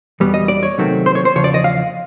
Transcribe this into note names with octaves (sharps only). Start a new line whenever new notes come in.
E2 B2 G3 B3
D#5
D5
C#5
C3 D#3 F#3 A3 C4
C5
C#5
C5
E2 C#3 F3 C#5
D5
D#5
F5